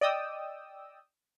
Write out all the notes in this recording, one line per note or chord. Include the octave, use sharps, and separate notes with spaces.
D5 D#5 G5 D#6 E6